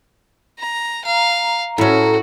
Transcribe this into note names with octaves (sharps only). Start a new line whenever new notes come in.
A#5
F5 A#5
A2 C#4 E4 F#4